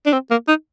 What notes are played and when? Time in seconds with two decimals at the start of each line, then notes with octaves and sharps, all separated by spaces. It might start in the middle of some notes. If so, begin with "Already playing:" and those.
0.06 D4
0.13 C4
0.31 A#3
0.48 D#4